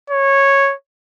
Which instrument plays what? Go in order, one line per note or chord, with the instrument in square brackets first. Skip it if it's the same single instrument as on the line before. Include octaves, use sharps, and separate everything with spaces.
[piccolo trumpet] C#5